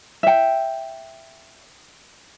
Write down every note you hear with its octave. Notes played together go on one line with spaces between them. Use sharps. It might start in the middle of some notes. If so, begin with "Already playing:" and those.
E5 G5